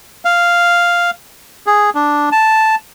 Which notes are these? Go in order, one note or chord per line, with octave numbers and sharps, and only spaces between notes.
F5
G#4
D4
A5